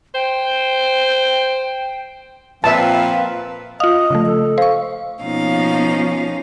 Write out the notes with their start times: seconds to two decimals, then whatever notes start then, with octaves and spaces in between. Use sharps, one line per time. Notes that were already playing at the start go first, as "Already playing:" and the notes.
0.15 C5 G5
2.64 A#2 F3 C4 F4 B4 E5 F5 A5
3.80 F4 D#5 F5 D#6
4.10 C#3 F3 A3
4.26 A4
4.58 C5 F5 C#6
5.21 B2 F3 A#3 C#4 D#4 F5